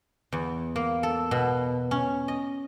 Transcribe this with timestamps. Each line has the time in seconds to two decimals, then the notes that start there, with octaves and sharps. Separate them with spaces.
0.32 E2
0.76 A#3
1.03 A4
1.31 B2
1.91 C#4
2.28 D#5